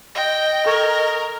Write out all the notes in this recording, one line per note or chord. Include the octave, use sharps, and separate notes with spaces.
D#5 G5 A#6
A4 A#4 C#6 G#6